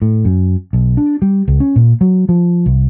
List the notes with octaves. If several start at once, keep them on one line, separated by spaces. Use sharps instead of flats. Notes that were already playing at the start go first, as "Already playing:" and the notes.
A2
F#2
B1
D4
G3
C#2
C#4
A#2
F#3
F3
C2